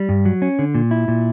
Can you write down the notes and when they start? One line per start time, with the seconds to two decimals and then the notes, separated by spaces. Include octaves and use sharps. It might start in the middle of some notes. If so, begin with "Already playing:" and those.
Already playing: G3
0.09 G2
0.25 F#3
0.42 C#4
0.59 D3
0.75 A#2
0.91 E4
1.08 A#2